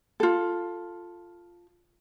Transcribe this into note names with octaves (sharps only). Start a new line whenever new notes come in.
F4 A4